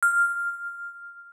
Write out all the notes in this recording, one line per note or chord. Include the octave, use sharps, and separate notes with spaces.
F6